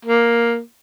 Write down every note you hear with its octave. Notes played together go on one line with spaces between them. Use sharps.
A#3